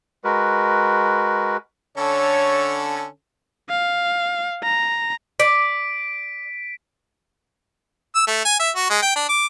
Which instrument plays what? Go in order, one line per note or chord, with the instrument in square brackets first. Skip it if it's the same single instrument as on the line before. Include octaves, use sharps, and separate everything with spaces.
[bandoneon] G#3 F#4 A#4 B4
[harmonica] D3 C#4 A4 [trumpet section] C#5
[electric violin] F5
A#5
[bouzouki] D5 [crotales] B6 D7
[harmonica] E6
A3
G#5
E5
F#4
G#3
G5
D4
D6